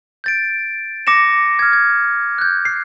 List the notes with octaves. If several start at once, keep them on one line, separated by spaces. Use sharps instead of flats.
G6 A6 D7
D6 A#6 C#7 E7
F6 G#6
G#6
F#6 G6
C7